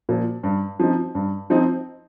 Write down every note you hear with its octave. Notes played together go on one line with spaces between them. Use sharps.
A#2 F3
G2
F3 C4 D#4
G2
F3 C4 D#4